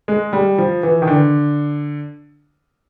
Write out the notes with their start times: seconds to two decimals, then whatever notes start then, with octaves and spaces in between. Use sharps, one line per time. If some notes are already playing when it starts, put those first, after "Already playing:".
0.08 G#3
0.33 G3
0.58 F3
0.83 E3
1.02 D#3
1.07 D3